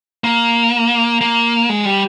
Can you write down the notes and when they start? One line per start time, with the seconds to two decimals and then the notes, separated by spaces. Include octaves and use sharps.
0.24 A#3
1.21 A#3
1.69 G#3
1.85 G3